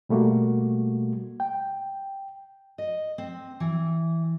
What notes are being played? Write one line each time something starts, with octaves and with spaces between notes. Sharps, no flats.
B2 G3 A3 A#3 F#4
G5
D#5
C4
E3